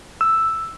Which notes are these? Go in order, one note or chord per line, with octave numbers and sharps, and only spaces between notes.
E6